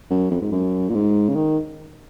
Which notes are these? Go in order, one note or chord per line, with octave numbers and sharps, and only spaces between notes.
F#2
F2
G#2
F#2
A#2
G#2
C#3
D#3